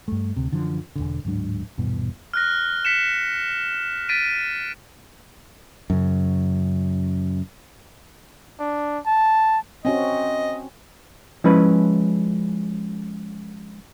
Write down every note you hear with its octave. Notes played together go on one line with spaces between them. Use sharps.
G2 A3
D2 C3
F#2 D3 E3 F3
E1 A#1 D3
D1 G#2 F#3 D4
D#1 G2 B2 E3
F6 F#6 A#6
B6 C#7 E7
A6 B6 D7 D#7
F#2 C#3
D4
A5
C4 C#4 F#4 D#5
F3 G#3 C#4 E4 B4 B5